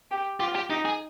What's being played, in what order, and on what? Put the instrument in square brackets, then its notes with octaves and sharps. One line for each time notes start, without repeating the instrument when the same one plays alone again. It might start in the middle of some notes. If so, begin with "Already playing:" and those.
[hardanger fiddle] G4
[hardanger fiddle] F4 [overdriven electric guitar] G4
[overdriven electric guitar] G4
[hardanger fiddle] D#4 [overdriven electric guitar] G4
[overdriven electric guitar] G#4